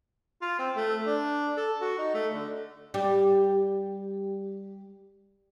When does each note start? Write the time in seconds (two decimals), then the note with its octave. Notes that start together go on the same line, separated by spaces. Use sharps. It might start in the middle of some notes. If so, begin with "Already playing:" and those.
0.41 F4
0.59 C4
0.76 A3
1.06 D4
1.57 A4
1.81 F#4
1.98 D#4
2.14 A3
2.33 D3
2.94 G3 G4